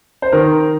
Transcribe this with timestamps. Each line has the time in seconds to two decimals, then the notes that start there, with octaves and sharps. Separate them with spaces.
0.22 C5
0.32 D#3 A#4